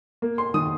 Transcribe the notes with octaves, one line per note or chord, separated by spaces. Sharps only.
A#3
C6
D#3 D#6